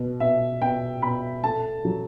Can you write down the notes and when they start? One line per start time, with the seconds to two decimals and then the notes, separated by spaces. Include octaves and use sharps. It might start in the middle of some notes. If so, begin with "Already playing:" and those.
Already playing: B2
0.20 B2 E5
0.62 B2 G5
1.02 B2 B5
1.43 A3 A5
1.85 F#3